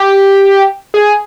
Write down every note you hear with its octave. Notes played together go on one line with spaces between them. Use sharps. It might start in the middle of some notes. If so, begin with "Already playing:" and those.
Already playing: G4
G#4